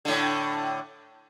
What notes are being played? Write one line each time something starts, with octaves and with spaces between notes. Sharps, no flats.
A2 D3